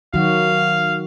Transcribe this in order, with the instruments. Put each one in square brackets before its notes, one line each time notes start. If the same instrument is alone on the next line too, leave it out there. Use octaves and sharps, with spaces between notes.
[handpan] D#3 F#3 F#4 [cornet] F5